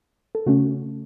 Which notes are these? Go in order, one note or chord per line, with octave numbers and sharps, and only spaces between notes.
A4
C#3 A3 C#4 F#4